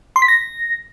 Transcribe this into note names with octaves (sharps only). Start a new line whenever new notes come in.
C6
B6
A#6